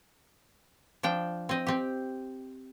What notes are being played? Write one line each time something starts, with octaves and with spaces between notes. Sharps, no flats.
F3 D4 G5
C4 D#5
C4 G4